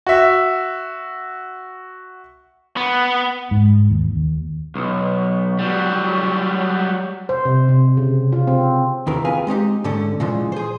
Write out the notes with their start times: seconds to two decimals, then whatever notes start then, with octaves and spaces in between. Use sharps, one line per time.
0.07 F#4 E5
2.77 B3
3.51 G#2
3.90 D#2
4.16 D#2
4.75 B1
5.59 F#3 G3
7.29 C5
7.45 C3
7.69 C3
7.97 C#3
8.32 F4
8.47 C4
9.07 D#2 C3 E3 A#4
9.25 C4 F4 G#4 B4 F5 G#5
9.47 G#3 C4 D#4 G4
9.84 G#2 D3 A3 C#4
10.20 A#2 C#3 E3 F3 G#3
10.52 G#4 C5